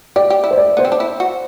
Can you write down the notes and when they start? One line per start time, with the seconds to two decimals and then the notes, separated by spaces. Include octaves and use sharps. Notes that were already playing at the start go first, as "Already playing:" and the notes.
0.16 G4 D5
0.30 G4
0.44 E4
0.51 C5
0.58 D5
0.77 B3 C5
0.85 C4
0.92 D4
1.00 E4
1.20 F#4